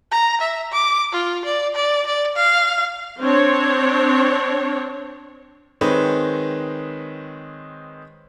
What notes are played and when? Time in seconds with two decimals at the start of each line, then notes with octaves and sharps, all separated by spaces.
0.11 A#5
0.41 E5
0.72 D6
1.12 F4
1.45 D5
1.75 D5
2.07 D5
2.37 F5
3.19 C4 D4 C#5
5.81 D#3 G#3 C4 B4 C#5 D#5